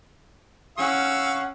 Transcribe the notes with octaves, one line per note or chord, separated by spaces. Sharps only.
C#4 F5 F#5 C#6 E6